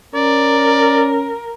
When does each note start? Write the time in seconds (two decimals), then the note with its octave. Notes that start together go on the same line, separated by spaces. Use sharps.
0.15 C#4 A#4 D5